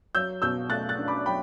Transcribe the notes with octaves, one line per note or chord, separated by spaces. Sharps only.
F#3 E6 G6
B2 E6 G6
A3 F#6 A6
F#6 A6
D4
B5 D6
F#3 G5 B5